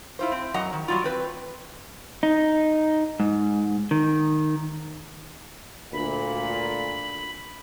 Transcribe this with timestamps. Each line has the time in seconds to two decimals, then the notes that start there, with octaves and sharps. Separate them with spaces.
0.19 E4 F4 C5
0.32 C4
0.54 F#2 F#3 D#5 F#5 A#5
0.73 D#3
0.88 F#3 G3 F4
1.04 C4 B4
2.23 D#4
3.20 G#2
3.91 D#3
5.93 D2 A#2 B5